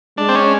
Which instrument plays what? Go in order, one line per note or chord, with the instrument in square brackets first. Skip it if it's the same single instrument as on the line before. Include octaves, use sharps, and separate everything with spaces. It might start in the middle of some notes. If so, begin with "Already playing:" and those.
[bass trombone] G#3 [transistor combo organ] D4
[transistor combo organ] C4
C#4